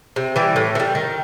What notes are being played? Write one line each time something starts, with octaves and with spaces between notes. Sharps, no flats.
C3
E3 G3
A2
E3
G3
D#3